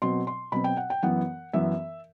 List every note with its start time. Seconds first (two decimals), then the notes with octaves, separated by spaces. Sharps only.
0.02 B2 F#3 C4 C6
0.27 C6
0.52 B2 F#3 C4 B5
0.64 G5
0.77 F#5
0.90 G5
1.03 F#2 E3 B3 F#5
1.53 F#2 E3 B3 E5